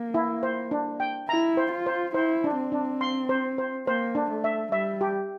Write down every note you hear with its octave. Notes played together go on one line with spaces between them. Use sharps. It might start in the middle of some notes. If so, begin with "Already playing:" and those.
Already playing: A#3
E4
C5
D4
G5
E4 A#5
C5
F4
C5
E4 C5
D4
C4
D4
C6
C5
C5
A#3 C5
D4
A3
E5
G3 E5
G4